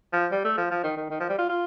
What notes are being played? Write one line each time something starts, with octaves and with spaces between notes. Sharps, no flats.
F3
G3
A3
F3
F3
D#3
D#3
D#3
F3
G3
F4
F4